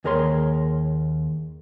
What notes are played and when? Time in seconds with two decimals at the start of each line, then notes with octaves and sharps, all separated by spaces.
0.04 D#2 G#4 A#4 C#5 C6